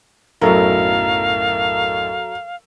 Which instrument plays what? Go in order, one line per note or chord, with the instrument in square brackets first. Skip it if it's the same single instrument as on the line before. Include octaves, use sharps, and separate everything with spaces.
[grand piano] B1 F#2 A2 [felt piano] F#3 A4 A#4 [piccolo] F5